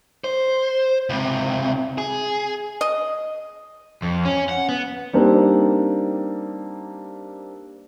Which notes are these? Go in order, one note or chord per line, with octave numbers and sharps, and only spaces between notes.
C5
C#2 C3
G#4
D#5
F2
C#4
F#5
B3
G3 A#3 C4 D4 D#4